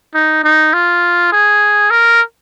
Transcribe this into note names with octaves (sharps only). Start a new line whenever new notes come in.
D#4
D#4
F4
G#4
A#4